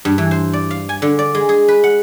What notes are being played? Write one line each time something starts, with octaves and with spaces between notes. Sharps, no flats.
G2
E3
C5
D5
F5
G#5
D3
D5
G#3
G#4
B4
F#5